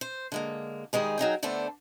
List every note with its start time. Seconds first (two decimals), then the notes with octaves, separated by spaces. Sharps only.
0.01 C5
0.32 D3 G#3 A#3
0.93 D#3 G3 G#3 G#4
1.18 F#3 D#4 G#4 G5
1.43 D3 A3 B3 D4 A4 C5